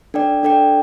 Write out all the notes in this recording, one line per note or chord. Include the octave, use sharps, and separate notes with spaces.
D4 A4 D5 G5
D4 A4 D5 G5